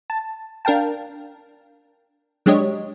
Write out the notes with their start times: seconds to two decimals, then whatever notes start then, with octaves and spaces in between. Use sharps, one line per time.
0.10 A5
0.65 D4 A#4 F5 G5 A5
2.46 F#3 G#3 D4 G4 C#5 D#5